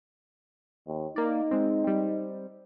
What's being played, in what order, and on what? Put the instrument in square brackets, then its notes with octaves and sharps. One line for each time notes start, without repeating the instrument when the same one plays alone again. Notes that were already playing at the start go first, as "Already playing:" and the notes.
[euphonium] D#2
[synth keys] A#3 D5 [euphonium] D#4
[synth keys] G#3 C4
G3 C4